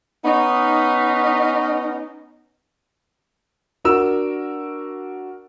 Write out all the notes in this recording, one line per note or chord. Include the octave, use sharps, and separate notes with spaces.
B3 C#4 D#4
D4 F#4 A#4 E6 E7